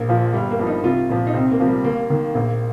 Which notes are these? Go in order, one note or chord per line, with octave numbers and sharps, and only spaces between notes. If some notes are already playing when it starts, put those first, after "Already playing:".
Already playing: A#1 A#3
A#2 F3
G1 G3
A#3
G2 F3
D#4
C2 F4
A#2 F3
D#4
C2 C4
A#3
C3 F3
G3
D#2 A#3
D#3
A#1 A#3